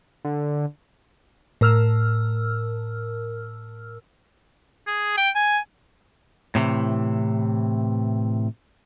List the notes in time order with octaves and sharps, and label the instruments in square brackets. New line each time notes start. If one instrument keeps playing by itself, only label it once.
[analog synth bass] D3
[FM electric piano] A2 A#4 E6 F6
[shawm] G#4
G5
G#5
[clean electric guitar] A2 C3 E3